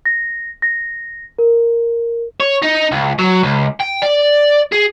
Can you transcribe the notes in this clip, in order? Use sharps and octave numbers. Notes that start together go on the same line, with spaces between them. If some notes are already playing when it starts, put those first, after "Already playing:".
A#6
A#6
A#4
C#5
D#4
C#2
F#3
C#2
G5
D5
G#4